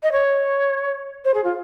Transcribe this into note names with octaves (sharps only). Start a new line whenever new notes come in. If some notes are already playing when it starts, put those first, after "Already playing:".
D#5
C#5
C5
G#4
F4